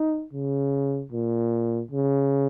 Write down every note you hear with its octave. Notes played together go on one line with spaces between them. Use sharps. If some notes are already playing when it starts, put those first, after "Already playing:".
Already playing: D#4
C#3
A#2
C#3